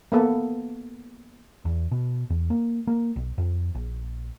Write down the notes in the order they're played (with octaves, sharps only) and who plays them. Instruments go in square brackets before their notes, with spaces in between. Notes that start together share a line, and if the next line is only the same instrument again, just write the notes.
[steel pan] A#3 B3 A4
[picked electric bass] E2
B2
E2
A#3
A#3
B1
F2
A#1